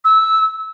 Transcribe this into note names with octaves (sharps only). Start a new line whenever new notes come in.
E6